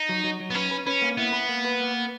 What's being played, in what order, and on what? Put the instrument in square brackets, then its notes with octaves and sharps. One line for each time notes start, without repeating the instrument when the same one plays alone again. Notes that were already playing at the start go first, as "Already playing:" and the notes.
Already playing: [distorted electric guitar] D#4
[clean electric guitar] F#3
F#3
F#3
[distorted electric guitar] B3
[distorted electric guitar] C#4 [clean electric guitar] B4
[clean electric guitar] B4
[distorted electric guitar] C#4 [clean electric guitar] B4
[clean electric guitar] A#3
[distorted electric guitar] B3 [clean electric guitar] E4
[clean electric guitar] B4
A#3
B4
A#3